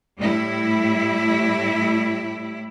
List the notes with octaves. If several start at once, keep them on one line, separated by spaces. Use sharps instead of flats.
A2 G3 E4